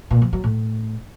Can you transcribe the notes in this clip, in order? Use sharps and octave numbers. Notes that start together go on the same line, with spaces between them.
A#2
F3
F#3
A2